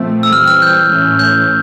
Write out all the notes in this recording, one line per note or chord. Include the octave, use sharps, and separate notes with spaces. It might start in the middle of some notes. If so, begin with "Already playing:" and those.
Already playing: A#2 F3 A3 C4
E6
E3 G3 C4 F6
F6
G6
A2 E3 A3 C#4
G6